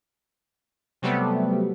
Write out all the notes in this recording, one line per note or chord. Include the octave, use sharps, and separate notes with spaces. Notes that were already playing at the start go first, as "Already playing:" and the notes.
C3 F#3 G3 A3 B3